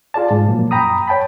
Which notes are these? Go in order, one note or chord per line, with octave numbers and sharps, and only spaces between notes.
F4 G#4 D5 A5
G#2
A#2 F3 F#3 A#3
F#2 G5 A#5 B5 D#6
C#5 G5 A5 B5